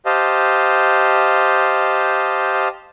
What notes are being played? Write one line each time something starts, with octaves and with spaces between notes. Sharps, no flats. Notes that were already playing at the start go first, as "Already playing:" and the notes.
G4 C5 D#5 F5 A5